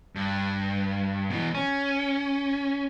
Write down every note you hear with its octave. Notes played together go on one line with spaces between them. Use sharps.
G2
B2 E3
C#4